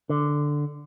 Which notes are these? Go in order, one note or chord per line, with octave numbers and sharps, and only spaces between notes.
D3